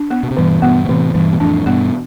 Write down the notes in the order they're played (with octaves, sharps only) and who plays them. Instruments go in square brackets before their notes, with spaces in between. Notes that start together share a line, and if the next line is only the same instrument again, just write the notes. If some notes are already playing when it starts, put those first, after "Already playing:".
Already playing: [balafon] D4
B3
[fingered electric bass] B2
C3
[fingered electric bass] G2 B2 [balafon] E3
[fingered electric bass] G2 B2 [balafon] B3
[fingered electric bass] B2
[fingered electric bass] A2 C3 [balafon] E3
[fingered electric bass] G2 B2 [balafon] E3
[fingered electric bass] B2
[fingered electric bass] F2 A2 [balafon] D4
[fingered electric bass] G2 B2 [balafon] B3